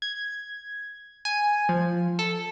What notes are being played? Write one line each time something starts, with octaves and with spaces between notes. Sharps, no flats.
G#6
G#5
F3
A4